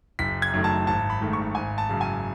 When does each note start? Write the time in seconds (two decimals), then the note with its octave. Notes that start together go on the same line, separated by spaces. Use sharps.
0.19 F#1 B6
0.42 G#6
0.53 F#2 D#3 A3
0.64 A5
0.87 G#1 A5
1.10 B5
1.21 G#2 D#3 A3
1.33 C#6
1.55 G#1 G#5
1.78 A5
1.89 F#2 C#3
2.01 G#5